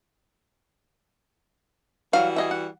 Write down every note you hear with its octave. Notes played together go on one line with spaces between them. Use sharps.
E3 F#3 G3 F#4 F5
G#4 D#5 E5
F#5